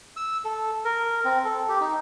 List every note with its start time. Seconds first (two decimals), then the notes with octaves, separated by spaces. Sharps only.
0.17 E6
0.45 A4
0.85 A#4
1.25 C4
1.45 A4
1.69 G4
1.81 D#4